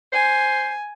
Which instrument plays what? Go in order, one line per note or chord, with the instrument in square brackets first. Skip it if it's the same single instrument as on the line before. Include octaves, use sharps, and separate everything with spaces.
[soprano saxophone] C5 [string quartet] G#5